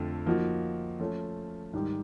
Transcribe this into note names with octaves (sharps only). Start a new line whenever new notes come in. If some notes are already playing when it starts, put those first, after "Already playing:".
Already playing: F2 D3 F3 A3
F3 A#3 D#4 F#4
F3 A3 C#4
G#2 D#3 G3